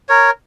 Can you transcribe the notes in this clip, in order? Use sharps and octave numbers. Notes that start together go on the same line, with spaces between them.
A#4 C#5